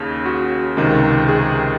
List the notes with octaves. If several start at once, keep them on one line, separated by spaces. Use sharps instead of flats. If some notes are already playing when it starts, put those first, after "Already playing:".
Already playing: D#2 C#3
F#4
C#2 C3 D#3
G#4